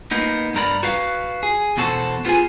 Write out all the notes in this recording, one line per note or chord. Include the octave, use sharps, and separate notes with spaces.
A#3 B3 D#4
G2 B3 A#4 B4 D5 B5
F#4 B4 F5
G#4
E2 B2 F#4 A4 C5
B3 F4 F#4 G#4 G#5